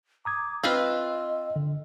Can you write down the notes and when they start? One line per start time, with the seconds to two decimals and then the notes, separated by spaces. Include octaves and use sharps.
0.25 A#5 D6 D#6 G#6
0.64 C4 F4 B4 D#5 G5 E6
1.56 D3